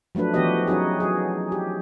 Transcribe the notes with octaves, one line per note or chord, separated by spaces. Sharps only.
F3 F#3 A3 D4 B4
E3 F3 B3 F#4 G4 D#5
F#3 C#4 D#4 F#4 G#4
F#3 G#4
G4